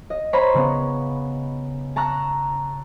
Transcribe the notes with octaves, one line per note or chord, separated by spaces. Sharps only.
D#5
C5 C#5 A#5 B5 C#6
C#3 B3
A5 A#5 C#6 E6 F#6 A#6